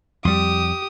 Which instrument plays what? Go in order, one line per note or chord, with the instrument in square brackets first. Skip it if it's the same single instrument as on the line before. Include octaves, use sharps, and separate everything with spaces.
[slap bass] F2 G3 [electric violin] G4 D#6